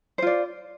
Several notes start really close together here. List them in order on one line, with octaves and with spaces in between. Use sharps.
C5 F4 D5